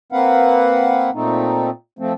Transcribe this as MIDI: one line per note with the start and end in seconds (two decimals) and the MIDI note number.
0.12 1.10 58
0.12 1.10 60
0.12 1.10 71
0.12 1.10 77
0.12 1.10 78
1.14 1.70 46
1.14 1.70 57
1.14 1.70 60
1.14 1.70 63
1.99 2.13 53
1.99 2.13 57
1.99 2.13 60